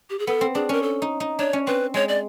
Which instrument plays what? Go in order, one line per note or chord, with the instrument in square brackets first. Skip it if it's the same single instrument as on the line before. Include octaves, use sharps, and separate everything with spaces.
[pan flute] G4
G#4
[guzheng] B3 [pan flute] A4
[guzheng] C4
[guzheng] D4 [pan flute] G#4
[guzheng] C#4 [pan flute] A#4
[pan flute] A4
[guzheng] D#4
D#4
[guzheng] D4 [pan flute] C#5
[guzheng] C#4
[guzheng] C4 [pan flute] B4
[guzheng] G#3 [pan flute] C#5
[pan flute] D5